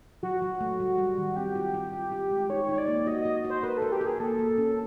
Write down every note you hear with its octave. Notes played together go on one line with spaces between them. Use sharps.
F#3 F#4
F#3
A3
G3
G3
D#3
C4 G4
F4
F4
F4
F4
G#3
D#4 C#5
D#4 C#5
D5
A#3
F#4 D#5
F#4 D#5
F#4
C5
A#4 B4
A4 A#4
G4
A#4
G#4
A#3 A4
A#3
C#4